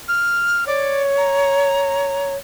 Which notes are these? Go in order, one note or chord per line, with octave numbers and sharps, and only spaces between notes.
F6
C#5 D5
A#5